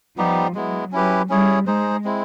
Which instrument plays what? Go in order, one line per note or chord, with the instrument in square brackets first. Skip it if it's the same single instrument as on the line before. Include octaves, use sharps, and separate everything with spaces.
[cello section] F3 [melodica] G3 B3 D#4 G4
[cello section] F#3 [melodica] G#3 B3 E4
[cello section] F#3 [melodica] C#4 E4 G4 B4
[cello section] G3 [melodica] C#4 E4 G#4 C#5
[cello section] G#3 [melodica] D#4 G#4 C5
[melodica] G#3 C4 E4